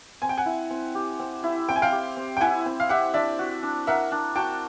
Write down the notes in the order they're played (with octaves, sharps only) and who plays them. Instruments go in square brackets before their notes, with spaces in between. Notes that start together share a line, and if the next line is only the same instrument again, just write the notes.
[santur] C4 [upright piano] G#5
[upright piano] G5
F#5 G#5
[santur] E4
C4
G4
C4
E4
[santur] C4 [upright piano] G5
[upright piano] G#5
F5 G5
[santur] G4
C4
[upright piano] G5
[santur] E4 [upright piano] F#5 G#5
[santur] C4
[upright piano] F5
[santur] G4 [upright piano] E5 F#5
[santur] D4 [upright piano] D5 E5
[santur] F#4
D4
[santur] A#4 [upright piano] E5 F#5
[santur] D4
[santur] F#4 [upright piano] G5 A5